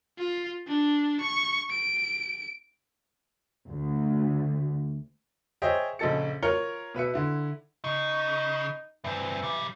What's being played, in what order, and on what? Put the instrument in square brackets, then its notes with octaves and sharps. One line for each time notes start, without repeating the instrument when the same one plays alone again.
[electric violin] F4
D4
C#6
D7
[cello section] D2
[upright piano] G#4 C5 C#5 D#5 E5 G5
A#1 C#3 D#4 A4 A6 C#7
F4 A#4 C#5 F6 C#7 G7
B2 B4 E5 C#7
D3 E4
[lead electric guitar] C#3 [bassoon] D#4
[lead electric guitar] G2 C4 [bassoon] E3
[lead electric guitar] B1 G3